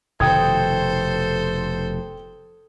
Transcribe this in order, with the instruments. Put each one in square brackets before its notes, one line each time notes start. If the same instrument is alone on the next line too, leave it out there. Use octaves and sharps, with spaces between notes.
[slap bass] F1 B2 D#3 [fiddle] A4 C5 [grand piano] G5 D#6 G#6